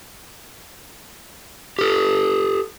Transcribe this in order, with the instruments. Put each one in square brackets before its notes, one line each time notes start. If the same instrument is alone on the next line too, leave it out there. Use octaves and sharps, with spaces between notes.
[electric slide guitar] G4 A4